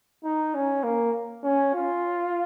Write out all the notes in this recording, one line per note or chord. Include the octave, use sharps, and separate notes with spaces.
D#4
C#4
A#3
C#4
F4